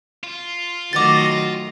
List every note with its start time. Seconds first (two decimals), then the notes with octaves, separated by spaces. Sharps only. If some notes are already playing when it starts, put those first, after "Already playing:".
0.24 F4
0.93 D#3 F#3 A3 F#4 D#5 D6 A6